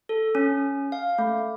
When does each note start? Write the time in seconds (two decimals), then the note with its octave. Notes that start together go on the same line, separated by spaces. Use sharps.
0.09 A4
0.35 C#4
0.92 F5
1.18 A3